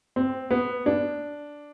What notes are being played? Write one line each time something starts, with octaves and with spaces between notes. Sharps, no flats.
C4
B3
D4